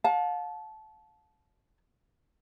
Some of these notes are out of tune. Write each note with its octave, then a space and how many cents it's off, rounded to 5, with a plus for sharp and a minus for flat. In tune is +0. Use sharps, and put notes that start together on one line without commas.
F5 +40 A5 -20